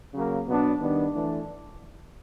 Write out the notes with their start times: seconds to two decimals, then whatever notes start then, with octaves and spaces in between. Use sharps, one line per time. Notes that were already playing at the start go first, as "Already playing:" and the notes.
0.13 C#3 F#3 A#3
0.47 B2 F#3 B3 D4
0.80 D#3 G3 B3 D4
1.13 E3 A3 D4